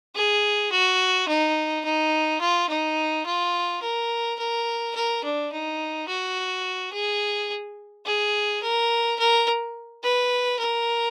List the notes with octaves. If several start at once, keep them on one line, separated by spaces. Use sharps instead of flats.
G#4
F#4
D#4
D#4
F4
D#4
F4
A#4
A#4
A#4
D4
D#4
F#4
G#4
G#4
A#4
A#4
B4
A#4